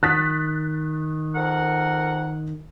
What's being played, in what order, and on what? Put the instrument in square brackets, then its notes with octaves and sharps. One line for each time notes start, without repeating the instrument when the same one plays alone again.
[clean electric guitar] D#3 [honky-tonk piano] F#6 A6 B6
[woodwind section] F2 A#4 F#5